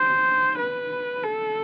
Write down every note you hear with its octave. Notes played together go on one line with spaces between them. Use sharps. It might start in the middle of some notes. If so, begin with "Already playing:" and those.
Already playing: C5
B4
A4